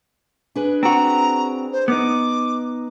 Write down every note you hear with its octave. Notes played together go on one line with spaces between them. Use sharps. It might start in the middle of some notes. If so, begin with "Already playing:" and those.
D4 G#4 B4
C4 F#4 A#5
C5
B3 D#4 D6